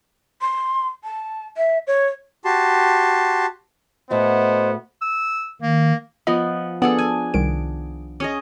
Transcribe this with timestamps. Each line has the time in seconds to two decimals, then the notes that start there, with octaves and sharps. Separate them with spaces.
0.41 C6
1.04 A5
1.57 E5
1.87 C#5
2.45 F#4 G4 A5 C6
4.11 A2 A3 B3 F#4 C5 D#5
5.01 E6
5.62 D#3 A#3
6.27 F3 B3 D#5
6.82 B3 D4 G#4 A4
6.99 G#5
7.34 C2 D#3 D7
8.20 C#4 G#4 D#5 C#6